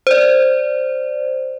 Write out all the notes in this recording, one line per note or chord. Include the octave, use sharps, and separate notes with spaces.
C5 D5